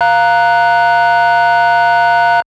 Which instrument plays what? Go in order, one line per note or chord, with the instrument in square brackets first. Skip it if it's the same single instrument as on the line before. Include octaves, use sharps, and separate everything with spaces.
[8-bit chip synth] F5 A#5 F#6